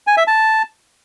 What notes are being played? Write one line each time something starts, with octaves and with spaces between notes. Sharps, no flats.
G#5
E5
A5